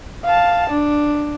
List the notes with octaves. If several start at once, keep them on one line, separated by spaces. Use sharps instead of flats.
F5 A5
D4